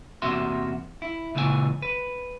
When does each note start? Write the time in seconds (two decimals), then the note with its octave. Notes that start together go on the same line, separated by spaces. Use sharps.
0.22 E2 C3 A#3 F#4 E5 C6
1.02 E4
1.35 C#2 A#2 C#3 E3 A4 G#5
1.82 B4